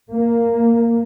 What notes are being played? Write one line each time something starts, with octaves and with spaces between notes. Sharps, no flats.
A#3